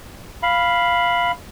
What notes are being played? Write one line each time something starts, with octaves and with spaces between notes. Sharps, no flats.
F5 B5